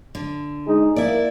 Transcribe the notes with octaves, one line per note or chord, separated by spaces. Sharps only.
D3
G#3 D#4 G#4
A#3 E4 D5